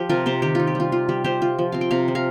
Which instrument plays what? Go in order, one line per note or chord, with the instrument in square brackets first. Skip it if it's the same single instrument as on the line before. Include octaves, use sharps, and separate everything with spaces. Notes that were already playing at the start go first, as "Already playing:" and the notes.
Already playing: [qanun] F3 G4
C3 F4 A#4
C3 G4 C5
D#3 G4
D#4 F4
G4
G3 F4
F4
G3 G4
G3 G4 C5
F4
F3
C4 F5
G5
C3 F5 A#5
F3
F5 A#5